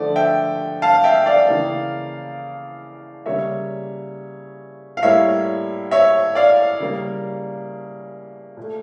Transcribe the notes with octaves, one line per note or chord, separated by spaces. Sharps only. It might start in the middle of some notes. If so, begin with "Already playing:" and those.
Already playing: D3 F3 A3 D5
E5 G5
F5 A5
E5 G5
D5 F5
C#3 E3 A#3
C#3 G3 A#3 C#5 E5
F5
A2 G3 A#3 C#5 E5
C#5 E5
D5 F5
C#3 G3 A#3
A#2 A3